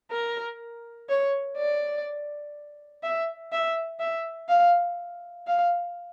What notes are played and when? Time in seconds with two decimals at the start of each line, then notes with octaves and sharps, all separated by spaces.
0.11 A#4
1.09 C#5
1.57 D5
3.03 E5
3.52 E5
4.00 E5
4.49 F5
5.47 F5